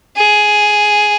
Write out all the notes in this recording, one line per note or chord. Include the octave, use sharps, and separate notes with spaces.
G#4